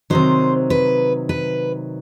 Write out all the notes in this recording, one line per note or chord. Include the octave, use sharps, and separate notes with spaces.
C3 D#3 F#3 C5
B4
B4